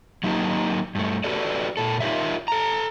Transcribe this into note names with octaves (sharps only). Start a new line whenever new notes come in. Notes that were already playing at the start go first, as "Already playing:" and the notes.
F#3 A#3 D#4 G4
G2 A3
F#4 G4 A4 B4 D5
A#2 A4
D#4 F4 G4 A#4 C#5 E5
A4 A#5